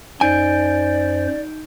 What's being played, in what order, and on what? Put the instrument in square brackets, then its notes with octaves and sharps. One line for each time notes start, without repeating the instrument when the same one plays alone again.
[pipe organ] F#2 C5 [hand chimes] D#4 G6 D7 [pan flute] D5 [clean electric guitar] G#5